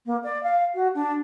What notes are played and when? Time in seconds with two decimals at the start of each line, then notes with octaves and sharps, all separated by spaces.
0.06 A#3
0.24 D5
0.43 F5
0.74 F#4
0.95 D4